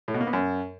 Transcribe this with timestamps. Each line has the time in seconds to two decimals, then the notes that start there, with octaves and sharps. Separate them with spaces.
0.08 A2
0.14 B2
0.21 A#3
0.27 B3
0.33 F#2